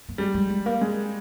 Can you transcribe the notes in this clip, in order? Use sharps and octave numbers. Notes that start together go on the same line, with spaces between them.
A#3
G3 G#3
G#3
G#3
A#3
G#3